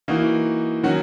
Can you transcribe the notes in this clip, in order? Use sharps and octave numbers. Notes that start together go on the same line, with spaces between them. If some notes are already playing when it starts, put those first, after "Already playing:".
E3 A#3 D#4 F#4
D#3 F#3 C#4 F#4